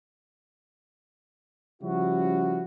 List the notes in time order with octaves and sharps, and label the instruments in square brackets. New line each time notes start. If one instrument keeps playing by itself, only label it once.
[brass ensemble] C#3 F3 G3 C#4 E4 F#4